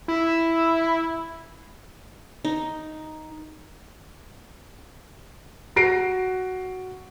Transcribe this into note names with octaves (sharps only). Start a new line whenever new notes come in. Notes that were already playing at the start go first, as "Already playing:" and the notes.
E4
D#4
F#4 A#6 C7 D7